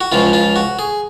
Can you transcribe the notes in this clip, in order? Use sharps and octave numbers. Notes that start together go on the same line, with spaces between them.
F#4
C#2 C#3 F3 F4
F4
F#4
G#4